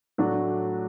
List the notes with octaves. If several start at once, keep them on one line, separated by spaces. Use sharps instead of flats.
A2 F#3 A3 D4 F#4